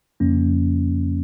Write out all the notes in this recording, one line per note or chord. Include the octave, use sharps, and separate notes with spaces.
F2 C#3 F3 A#3 C#4